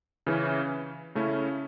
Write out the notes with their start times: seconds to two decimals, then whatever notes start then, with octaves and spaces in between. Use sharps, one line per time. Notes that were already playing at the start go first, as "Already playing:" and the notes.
0.27 C#3 E3 C#4
1.15 C#3 A3 C#4 E4